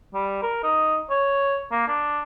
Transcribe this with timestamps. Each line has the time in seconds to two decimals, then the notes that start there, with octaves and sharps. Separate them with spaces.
0.14 G3
0.43 A#4
0.64 D#4
1.10 C#5
1.72 A#3
1.88 D4